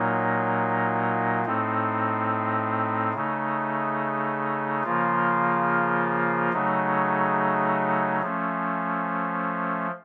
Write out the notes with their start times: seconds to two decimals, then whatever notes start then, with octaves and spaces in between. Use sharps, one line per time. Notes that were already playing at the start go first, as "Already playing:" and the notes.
Already playing: A#2 F#3 A#3 D#4
1.45 A2 A3 C4 D#4
3.14 C#3 A3 D#4
4.83 C#3 F3 A#3 F4
6.53 C#3 F#3 A3 D#4
8.22 F3 A3 C#4